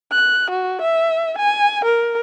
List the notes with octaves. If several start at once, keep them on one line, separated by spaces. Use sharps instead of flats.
F#6
F#4
E5
G#5
A#4